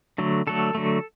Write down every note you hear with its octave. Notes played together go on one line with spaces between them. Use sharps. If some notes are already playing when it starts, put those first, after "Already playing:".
D3 F#3 A3
D3 F#3 A3 A4
D3 F#3 A3